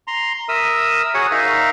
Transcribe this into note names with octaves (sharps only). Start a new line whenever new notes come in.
A#5 C6
A#4 E5 D#6 E6
F#4 G#4 C#5 F#5 D#6
D#4 A#4 E5 F5